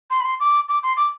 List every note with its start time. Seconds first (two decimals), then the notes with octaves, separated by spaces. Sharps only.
0.10 C6
0.21 B5
0.25 C6
0.40 D6
0.69 D6
0.83 C6
0.97 D6